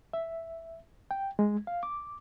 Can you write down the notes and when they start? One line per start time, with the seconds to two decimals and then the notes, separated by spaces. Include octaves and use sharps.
0.13 E5
1.11 G5
1.39 G#3
1.67 F5
1.83 D6